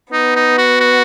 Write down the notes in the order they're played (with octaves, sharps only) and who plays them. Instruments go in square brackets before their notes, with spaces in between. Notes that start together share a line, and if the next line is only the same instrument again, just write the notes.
[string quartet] B3 [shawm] D#4
[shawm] D#4
F#4
F#4